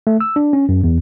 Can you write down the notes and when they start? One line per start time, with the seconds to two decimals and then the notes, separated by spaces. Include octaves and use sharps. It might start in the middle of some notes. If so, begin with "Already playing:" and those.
0.07 A3
0.20 E6
0.36 D4
0.53 C#4
0.69 F#2
0.83 E2